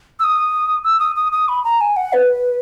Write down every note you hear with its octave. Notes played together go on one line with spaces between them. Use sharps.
E6
D#6
E6
D#6
D#6
D#6
B5
A#5
G#5
F#5
B4